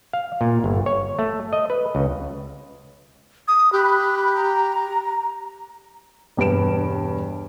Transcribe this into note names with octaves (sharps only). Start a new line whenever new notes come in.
F5
A#2
G1
C#5
A3
D#5
B4
C#2
D#6
G4 B5 F#6
A#5
E1 G2 B4 D7 E7